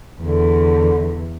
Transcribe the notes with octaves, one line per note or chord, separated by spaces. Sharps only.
E2 D3